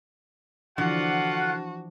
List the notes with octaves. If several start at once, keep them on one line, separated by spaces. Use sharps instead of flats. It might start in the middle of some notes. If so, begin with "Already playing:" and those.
D3 E3 F3 F4 F#4 F#5